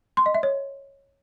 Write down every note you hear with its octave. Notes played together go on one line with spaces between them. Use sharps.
C6
D#5
E5
C#5